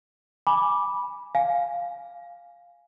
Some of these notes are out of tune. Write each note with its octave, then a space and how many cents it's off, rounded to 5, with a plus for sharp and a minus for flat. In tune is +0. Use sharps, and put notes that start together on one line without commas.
G#5 +0 B5 -10 D6 +0
F5 +0 G#5 +0